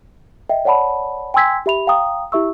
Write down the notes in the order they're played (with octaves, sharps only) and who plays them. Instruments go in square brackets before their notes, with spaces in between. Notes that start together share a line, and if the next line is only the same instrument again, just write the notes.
[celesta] D#5 E5 G5
C#5 D5 F#5 A5 B5
G5 G#5 C6 E6 G#6 B6
G4 E5 B5 F7
F5 G5 A#5 D#6
E4 G4 E5 C#6 E6